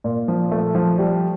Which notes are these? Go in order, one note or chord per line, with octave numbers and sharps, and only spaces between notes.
A#2
F3
A3
F3
G3